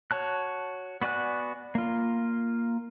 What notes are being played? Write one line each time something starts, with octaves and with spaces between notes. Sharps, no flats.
F#4 C#5 A5 F#6
B3 F#4 D5 G#5 F#6
A#3 F4